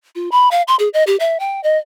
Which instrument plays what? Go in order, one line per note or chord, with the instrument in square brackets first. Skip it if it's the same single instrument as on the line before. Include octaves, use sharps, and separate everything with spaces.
[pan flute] F4
B5
F5
C6
G#4
D#5
G4
E5
G5
D#5